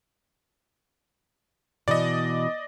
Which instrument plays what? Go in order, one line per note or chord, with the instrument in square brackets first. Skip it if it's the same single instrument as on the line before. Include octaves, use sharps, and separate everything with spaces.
[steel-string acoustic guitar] B2 E3 [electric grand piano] D5 D#5